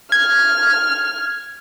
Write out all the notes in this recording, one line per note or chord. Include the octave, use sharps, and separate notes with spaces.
F6 G#6